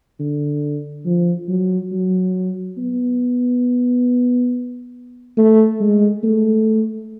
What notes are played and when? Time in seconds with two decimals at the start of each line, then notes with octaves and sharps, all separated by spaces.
0.20 D3
1.06 F3
1.49 F#3
1.92 F#3
2.78 B3
5.37 A3
5.81 G#3
6.23 A3